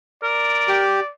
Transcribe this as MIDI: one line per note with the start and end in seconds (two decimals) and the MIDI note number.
0.23 0.79 70
0.23 1.11 74
0.68 1.00 67